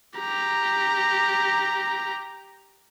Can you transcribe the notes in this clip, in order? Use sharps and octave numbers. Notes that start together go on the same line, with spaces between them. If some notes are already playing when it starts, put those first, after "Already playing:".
G4 A#5